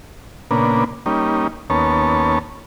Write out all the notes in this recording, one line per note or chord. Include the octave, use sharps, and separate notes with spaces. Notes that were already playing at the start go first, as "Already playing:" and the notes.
A#2 C#3 A#3 B3 D4
G3 A#3 C#4 D#4
D#2 A#3 B3 C#4 C#5 A5